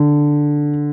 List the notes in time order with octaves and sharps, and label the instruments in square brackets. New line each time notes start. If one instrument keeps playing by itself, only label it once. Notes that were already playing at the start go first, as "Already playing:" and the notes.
Already playing: [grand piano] D3